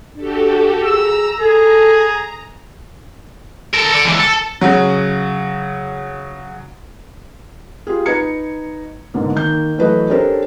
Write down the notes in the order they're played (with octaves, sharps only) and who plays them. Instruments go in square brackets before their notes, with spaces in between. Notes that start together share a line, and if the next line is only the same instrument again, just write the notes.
[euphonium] D4 [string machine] F#4 G4 A4
[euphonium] G#4 [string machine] A#5 [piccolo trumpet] E6
[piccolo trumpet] G#4 [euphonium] A4
[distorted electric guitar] A4 A#4
A4 D5
C#2 E3
A4
[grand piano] C#3 F#3
[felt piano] F4 G4 G#4
D#4 B4 A#5 G#6 C#7
G#2 B2 D3 A#3
D#3 A#3 G6
E3 F#3 A3 A4 B4 D#5
C#4 D4 G4 A4 A#4 C5